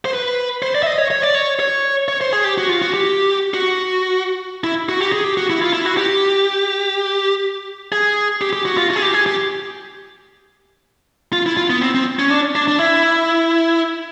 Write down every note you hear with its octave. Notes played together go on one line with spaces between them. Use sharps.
C5
B4
C5
D5
E5
D#5
C#5
C#5
D5
C#5
C#5
C#5
C5
G#4
G4
F#4
F4
F#4
G4
F#4
E4
F#4
G4
G#4
G4
F#4
E4
F4
E4
F#4
G4
G#4
G4
G4
F#4
F4
F#4
G#4
G4
G#4
G4
F4
E4
F4
B3
C4
C4
C#4
D4
D4
D4
E4